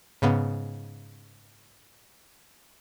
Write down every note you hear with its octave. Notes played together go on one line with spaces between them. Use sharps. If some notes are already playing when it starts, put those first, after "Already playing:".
G#2 C#3 B3